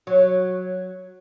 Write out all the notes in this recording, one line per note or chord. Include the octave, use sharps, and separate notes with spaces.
F#3